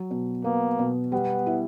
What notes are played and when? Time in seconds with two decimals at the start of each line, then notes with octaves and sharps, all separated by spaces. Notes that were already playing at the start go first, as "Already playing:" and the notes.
Already playing: F#3
0.11 B2
0.44 A#3 B3
0.79 B2
1.12 G3 B3
1.46 E4